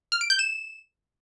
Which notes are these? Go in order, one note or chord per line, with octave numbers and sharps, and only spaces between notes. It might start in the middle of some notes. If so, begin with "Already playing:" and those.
F6
D7
G6
E7